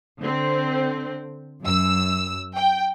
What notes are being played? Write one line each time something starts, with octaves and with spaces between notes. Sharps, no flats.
D3 C4
F#2 E6
G5